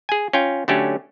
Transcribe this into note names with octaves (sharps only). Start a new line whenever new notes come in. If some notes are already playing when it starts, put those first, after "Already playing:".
G#4 G#5
C#4 F4 G5
D3 F#3 A3 C#4 G4